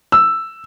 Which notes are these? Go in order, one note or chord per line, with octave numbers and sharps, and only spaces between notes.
E6